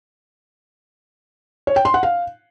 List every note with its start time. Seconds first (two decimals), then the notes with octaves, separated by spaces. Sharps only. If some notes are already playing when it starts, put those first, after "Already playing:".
1.67 C#5
1.76 G5
1.85 C6
1.94 F#5
2.03 F5